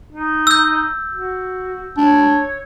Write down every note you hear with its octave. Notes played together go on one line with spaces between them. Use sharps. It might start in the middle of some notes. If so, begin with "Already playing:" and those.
D#4
E6 G6
F#4
D4 C#5